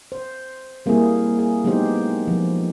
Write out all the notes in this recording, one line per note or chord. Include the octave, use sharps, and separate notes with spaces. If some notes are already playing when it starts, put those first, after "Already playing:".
C5
G3 A#3 C4 E4 G#4
G#4
F#3 G#3 B3 D#4 G4 C5
F3